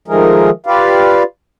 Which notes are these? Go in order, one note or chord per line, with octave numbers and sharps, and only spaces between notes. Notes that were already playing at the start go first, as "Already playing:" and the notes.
D#3 F3 G#3 A3 G#4 A#4
F4 G4 B4 D5 F5